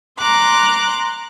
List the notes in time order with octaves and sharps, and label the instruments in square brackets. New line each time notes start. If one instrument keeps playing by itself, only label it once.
[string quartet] A#5 C6 D6 F#6